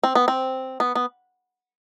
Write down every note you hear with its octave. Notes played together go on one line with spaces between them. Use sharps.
C4
B3
C4
B3
B3